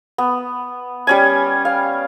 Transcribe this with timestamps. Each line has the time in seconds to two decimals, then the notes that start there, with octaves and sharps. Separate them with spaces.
0.18 B3
1.07 G3 C#4 G#5
1.65 F5